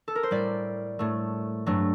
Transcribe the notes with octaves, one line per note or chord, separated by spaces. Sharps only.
A4
A#4
C5
A2 G3 D5
A2 A3
G2 F#3 A3